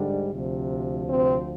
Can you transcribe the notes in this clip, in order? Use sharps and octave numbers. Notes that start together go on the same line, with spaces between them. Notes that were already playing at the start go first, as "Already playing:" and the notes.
Already playing: G#2 D3 G3 D4
D2 C3 F3
C3 C4